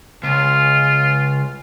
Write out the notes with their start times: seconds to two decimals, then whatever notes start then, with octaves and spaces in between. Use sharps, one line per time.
0.23 C#2 F4